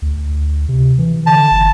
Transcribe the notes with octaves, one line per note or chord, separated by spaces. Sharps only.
D2
C3
E3
D3 A5
F#1